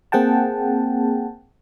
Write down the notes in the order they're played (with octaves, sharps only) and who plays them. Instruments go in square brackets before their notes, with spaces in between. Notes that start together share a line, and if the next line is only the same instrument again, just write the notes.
[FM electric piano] A#3 C4 G#4 F#5 G5 A5